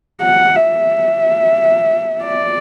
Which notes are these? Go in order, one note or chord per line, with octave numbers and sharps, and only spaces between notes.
F#5
E5
D5